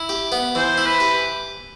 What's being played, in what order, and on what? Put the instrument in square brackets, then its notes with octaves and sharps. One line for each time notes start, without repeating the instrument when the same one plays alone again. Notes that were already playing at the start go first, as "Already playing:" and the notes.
Already playing: [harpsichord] E4
G4
B3
[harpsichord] E3 [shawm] C5
[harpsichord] E4
[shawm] B4
[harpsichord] G4